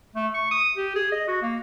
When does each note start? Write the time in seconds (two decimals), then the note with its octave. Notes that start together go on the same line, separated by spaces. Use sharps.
0.16 A3
0.34 C#6
0.51 D#6
0.77 G4
0.96 G#4
1.12 D#5
1.28 F#4
1.42 A#3